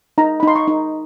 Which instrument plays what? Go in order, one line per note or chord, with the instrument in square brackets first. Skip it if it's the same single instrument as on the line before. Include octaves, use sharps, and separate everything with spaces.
[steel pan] D#4 A#5
B5
D#4 C6
C#6
D#4